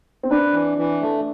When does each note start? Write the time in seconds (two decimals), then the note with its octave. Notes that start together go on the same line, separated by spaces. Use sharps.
0.23 C4
0.30 D4 B4
0.54 E3
0.78 E3
1.01 A3